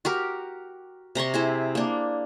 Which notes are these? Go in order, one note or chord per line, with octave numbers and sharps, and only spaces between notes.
F#4 G4 A#4
C3 A#5 C6 C#6
E4 G#4 C5
A#3 D4